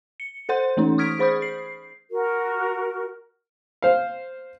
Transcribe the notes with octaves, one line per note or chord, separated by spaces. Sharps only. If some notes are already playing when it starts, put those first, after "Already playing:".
C#7
A4 C5 F#5 C6 G6
E3 A3 C#4 D#4
C#6 D#6 F6 G#6 B6 D7
G#4 C5 B5 C#6 D#6 G6
C7
F#4 A#4
C5 F5